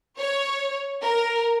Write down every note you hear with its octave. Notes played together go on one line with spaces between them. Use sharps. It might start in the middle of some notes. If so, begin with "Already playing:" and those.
C#5
A#4